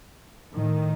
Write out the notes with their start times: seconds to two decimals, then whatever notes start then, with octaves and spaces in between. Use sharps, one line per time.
0.53 A2 D#3